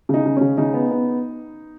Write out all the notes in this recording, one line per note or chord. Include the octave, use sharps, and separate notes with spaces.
C#3 D#4
C#3
C#3 C#4
C#3 D#4
B3
B3